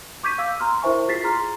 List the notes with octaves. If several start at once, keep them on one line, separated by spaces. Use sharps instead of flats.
C#6 D6 G6 G#6 B6 D#7
F5 E6
A#5 C6 F6
E4 A#4 C5 E5 G#5 C#6
F4 G#4 A6 B6 C7
G#4 A#5 C6 F6